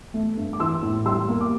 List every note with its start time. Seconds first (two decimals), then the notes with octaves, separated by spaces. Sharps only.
0.14 A3
0.37 G2
0.53 D6
0.60 E3 C6 E6
0.82 A2
1.06 G3 C6 E6
1.28 A#3
1.41 D6